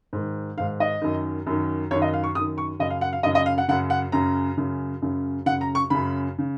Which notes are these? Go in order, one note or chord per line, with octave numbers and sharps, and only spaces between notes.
G#2 D#3
G#2 D#3 F5
D#5
F#2 D#3
F#2 D#3
F#2 D#3 C#5
D#5
F5
C#6
F#2 D#3 D#6
C#6
F#2 C#3 D#5
F5
F#5
F5
F#2 C#3 D#5
D#5
F5
F#5
F#2 C#3 F#5
F#5
F#2 C#3 A#5
F#2 C#3
F#2 C#3
F#2 C#3 F#5
A#5
C#6
F#2 C#3 B5
C#3